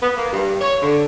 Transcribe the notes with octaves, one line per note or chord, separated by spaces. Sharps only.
B3
A#3
G2
C#5
D3